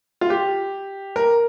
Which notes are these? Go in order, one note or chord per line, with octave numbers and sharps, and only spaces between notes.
F4
G4
A#4